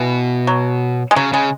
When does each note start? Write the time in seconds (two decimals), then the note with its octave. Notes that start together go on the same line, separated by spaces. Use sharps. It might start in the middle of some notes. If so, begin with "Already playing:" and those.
Already playing: B2 E3
0.47 F#3
1.11 G#3
1.16 C#3 F#3
1.33 C#3 G#3